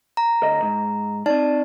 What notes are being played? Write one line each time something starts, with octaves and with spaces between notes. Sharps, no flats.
A#5
D2 D#5
G#2
C4 D#4 D5 A5